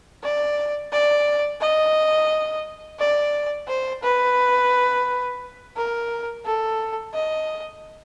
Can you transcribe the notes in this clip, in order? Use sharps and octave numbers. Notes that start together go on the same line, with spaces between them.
D5
D5
D#5
D5
C5
B4
A#4
A4
D#5